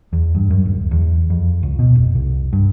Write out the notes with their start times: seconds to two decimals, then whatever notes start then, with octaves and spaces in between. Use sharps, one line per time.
0.13 E2
0.35 G2
0.50 F#2
0.65 D1
0.91 E2
1.30 F2
1.63 C#2
1.79 B2
1.95 F1
2.15 C2
2.53 G2